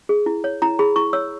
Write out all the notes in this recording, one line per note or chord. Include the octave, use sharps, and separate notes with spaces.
G#4
E4
C#5
E4 A#5
G#4 B5
E4 C#6
C#5 E6